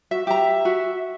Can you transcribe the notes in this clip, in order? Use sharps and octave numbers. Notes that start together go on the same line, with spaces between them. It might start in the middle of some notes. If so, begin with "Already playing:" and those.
F#4 E5
G4 E5 A#5
F#4